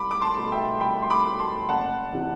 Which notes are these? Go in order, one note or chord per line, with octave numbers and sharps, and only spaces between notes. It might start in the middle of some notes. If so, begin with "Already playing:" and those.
Already playing: C2 B5 D6
D6
A5 C6
B2 A3
E5 G5
C2 G5 B5
C6
B5 D6
B2 A3
A5 C6
F#1 F#5 A5
C3 E3